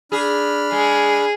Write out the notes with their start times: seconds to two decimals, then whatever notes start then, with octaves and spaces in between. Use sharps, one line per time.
0.12 D4 G#4 B5 F6
0.72 G#3 G#4